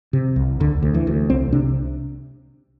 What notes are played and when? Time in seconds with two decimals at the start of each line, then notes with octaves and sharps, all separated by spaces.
0.13 C3
0.36 C2
0.60 D2 D3
0.83 D2
0.94 E3
1.07 D2
1.30 C2 C4
1.52 C3 D4